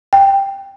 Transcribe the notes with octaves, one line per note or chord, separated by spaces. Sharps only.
G5